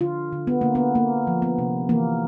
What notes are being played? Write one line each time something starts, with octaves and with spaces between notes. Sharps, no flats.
D3 F4
D3
B3
D3 A#3
B3
A#3
F3
B3
C3
E3 A#3